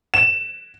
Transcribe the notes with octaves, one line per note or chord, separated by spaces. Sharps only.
E7